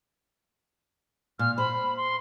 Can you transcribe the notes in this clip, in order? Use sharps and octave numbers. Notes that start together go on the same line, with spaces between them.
A#2 F6
C5 B5
C6